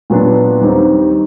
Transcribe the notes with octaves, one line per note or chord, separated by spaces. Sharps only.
A#2 F#3 B3 D4
D#2 D#3 G3 C4 D#4